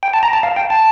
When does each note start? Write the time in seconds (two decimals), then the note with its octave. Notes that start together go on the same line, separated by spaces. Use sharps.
0.03 G5
0.14 A5
0.23 A#5
0.33 A5
0.43 F5
0.56 G5
0.70 A5